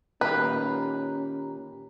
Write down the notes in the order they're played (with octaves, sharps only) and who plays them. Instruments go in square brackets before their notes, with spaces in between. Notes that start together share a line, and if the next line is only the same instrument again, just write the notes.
[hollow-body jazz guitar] A#2 D#3 A#3 [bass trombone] C#4 [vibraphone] G4 A#5 [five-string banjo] B4